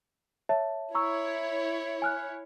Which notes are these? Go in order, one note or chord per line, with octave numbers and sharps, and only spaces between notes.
C#5 E5 A5
E4 C#5 A#5 C#6 E6
G#5 F6 F#6